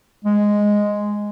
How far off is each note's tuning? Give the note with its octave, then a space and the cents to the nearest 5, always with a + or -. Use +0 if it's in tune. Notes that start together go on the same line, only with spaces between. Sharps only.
G#3 -5